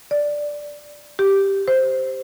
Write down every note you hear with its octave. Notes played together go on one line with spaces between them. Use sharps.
D5
G4
C5